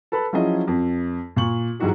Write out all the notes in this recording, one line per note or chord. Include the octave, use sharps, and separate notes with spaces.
A4 B4 A5 B5
F3 F#3 C#4 E4 G#4 D#5
F2
A#2 C#6 F#7
G#2 E3 F#3 D#4 F#4 G4